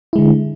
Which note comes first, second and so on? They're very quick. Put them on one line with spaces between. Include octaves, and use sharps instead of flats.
E4 G#3 D3